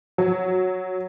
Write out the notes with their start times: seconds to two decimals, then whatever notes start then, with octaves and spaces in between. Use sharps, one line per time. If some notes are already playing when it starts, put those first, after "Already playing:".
0.18 F#3